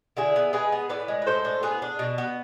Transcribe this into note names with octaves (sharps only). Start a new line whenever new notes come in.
D3 E4 G#4
B3
G#3 G#4 B4
B3
A2 B4 D5
G#3
B4
A2 A4 C5
D4
B3 G#4 B4
D4
B2
B3